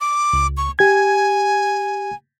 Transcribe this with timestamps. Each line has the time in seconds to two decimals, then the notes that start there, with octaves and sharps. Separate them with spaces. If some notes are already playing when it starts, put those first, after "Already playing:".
0.01 D6
0.33 C#2
0.57 C#6
0.79 G4 G#5 G#6